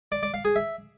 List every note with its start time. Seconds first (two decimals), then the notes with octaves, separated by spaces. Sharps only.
0.12 D5
0.23 D5
0.34 F5
0.45 G#4
0.56 E5